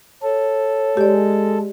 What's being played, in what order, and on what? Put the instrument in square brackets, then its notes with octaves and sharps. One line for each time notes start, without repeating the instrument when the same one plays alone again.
[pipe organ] A4 [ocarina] C#5
[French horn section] G#3 [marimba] G4 D5